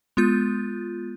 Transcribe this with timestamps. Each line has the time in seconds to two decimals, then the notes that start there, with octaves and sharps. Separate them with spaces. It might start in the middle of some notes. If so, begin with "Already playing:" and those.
0.17 G#3 B3 F4 G6